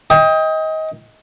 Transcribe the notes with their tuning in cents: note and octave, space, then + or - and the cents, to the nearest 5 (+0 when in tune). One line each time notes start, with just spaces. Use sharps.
D#5 +25 G5 +25